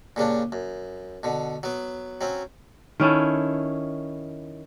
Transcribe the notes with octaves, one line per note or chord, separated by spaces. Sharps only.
A#2 C#3 G3 D4
F#2
B2 D3
F#3 B3
F#3 C4 C#4
D#3 C#4 E4 A4